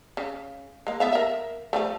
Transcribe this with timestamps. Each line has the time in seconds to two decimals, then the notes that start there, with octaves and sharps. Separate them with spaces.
0.17 C#3
0.87 G#3 A#3
1.00 B3 E5 F5
1.12 A#4 E5
1.73 F3 G3 A3